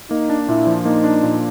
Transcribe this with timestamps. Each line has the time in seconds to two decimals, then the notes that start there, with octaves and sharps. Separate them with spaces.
0.10 A#3 D#4
0.30 D4
0.48 A#2 E4
0.67 F3
0.85 A#3 D#4
1.04 D4
1.23 A#2